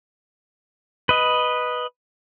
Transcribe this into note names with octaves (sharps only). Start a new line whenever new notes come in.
B4 D#5